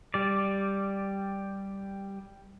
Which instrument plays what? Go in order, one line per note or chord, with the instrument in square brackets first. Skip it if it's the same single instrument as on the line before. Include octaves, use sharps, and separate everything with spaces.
[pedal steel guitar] G3 D5